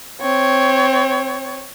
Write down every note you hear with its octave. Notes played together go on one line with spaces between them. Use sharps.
C4 C#5